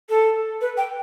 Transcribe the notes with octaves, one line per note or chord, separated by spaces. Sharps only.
A4
B4
G5